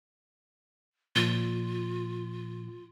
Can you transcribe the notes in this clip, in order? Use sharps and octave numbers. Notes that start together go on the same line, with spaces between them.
A#2 F3 F4